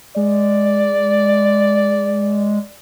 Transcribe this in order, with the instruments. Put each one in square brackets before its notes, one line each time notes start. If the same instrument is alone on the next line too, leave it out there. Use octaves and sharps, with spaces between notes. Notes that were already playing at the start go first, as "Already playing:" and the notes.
[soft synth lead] G#3 [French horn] D5